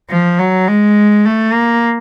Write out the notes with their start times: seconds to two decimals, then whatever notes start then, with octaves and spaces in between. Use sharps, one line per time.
0.10 F3
0.39 F#3
0.68 G#3
1.25 A3
1.54 A#3